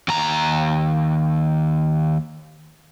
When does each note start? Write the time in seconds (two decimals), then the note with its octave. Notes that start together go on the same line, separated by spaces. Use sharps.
0.08 D#2 A#5